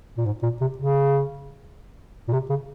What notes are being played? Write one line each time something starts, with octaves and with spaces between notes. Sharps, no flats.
A#2
G#2
A#2
C3
C#3
A#2
C3
C#3